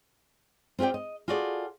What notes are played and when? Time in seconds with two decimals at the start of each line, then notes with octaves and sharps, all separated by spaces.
0.79 C4 F4 G4 D5 G5
0.94 D#5
1.28 F4 F#4 G#4 A4 D5